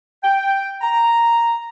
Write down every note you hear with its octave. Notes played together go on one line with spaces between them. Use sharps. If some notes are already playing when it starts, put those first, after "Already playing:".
G5
A#5